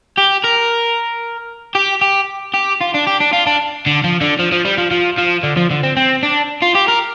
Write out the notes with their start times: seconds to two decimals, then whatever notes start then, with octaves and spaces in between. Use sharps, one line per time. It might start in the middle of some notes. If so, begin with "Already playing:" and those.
0.17 G4
0.44 A#4
1.75 G4
2.02 G4
2.54 G4
2.81 F4
2.94 D4
3.07 G4
3.20 D4
3.33 F4
3.47 D4
3.86 D3
4.04 F3
4.21 D3
4.39 F3
4.52 F3
4.65 G3
4.78 F3
4.91 F3
5.18 F3
5.43 D3
5.57 F3
5.71 D3
5.84 C4
5.97 C4
6.23 D4
6.62 F4
6.75 G4
6.89 A#4